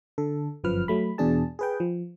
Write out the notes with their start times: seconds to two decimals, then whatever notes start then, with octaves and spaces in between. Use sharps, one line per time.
0.18 D3 A4
0.64 G1 F#2 F3 B4 F6
0.88 F#3 A3 B5
1.18 E2 B2 D4 G#4 A5
1.59 G#4 B4 G5
1.80 F3